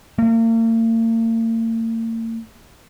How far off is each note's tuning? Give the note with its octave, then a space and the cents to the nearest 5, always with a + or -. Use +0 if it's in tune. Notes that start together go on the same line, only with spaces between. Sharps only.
A#3 -45